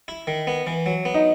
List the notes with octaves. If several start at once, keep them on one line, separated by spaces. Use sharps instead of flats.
E4
D#3
B3
E3
F#3
B3
D#4